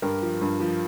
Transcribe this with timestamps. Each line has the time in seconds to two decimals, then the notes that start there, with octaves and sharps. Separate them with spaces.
0.02 G2 G4 A#4
0.22 F3
0.41 G2
0.60 F3